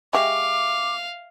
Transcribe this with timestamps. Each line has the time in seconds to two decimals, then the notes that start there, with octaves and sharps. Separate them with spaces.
0.13 G#3 G4 E5 F5 C#6 D6